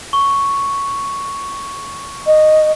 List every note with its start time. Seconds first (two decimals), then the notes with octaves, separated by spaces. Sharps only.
0.13 C#6
2.27 D#5